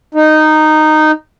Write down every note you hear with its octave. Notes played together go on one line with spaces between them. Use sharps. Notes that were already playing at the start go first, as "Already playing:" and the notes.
D#4